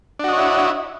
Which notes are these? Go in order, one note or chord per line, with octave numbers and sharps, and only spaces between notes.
D4 E4 F#4 C#5 D#5